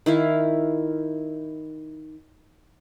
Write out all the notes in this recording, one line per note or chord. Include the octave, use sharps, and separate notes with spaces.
D#3 E4 F5